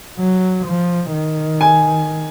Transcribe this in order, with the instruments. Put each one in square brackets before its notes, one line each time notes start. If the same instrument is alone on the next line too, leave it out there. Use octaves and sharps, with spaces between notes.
[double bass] F#3
F3
D#3
[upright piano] G#5